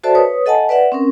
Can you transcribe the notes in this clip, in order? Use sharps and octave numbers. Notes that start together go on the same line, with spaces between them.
F#4 A4 C5 D5 E5 A5
B4 C#5 D#6
A4 D#5 F#5 G#5 A5
B4 D5 E5 F#5
C4 C#4 A#4